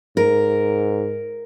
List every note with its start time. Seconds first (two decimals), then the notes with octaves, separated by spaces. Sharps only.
0.17 G#2 A#4